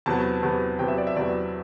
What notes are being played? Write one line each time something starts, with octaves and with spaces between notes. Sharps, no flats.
E2 C3 F#3 B3 A5
E2 C3 F#3 B3
E2 C3 F#3 B3 G5
E5
D5
E5
E2 C3 F#3 B3 D5